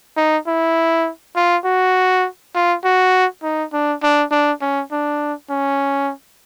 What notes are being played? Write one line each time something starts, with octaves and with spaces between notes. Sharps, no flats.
D#4
E4
F4
F#4
F4
F#4
D#4
D4
D4
D4
C#4
D4
C#4